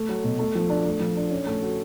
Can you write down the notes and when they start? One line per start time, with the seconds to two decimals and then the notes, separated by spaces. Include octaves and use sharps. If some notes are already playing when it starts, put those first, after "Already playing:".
Already playing: A3
0.09 F#3
0.24 B2
0.39 A3
0.55 F3
0.70 D4
0.85 A3
1.00 F3
1.17 D4
1.31 C#4
1.47 A3
1.62 F#4